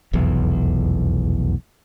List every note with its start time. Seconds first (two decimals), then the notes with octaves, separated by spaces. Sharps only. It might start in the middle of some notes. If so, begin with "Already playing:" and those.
0.13 F1 B1 E2